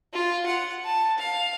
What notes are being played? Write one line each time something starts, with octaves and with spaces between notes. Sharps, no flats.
F4
F#5
A5
F5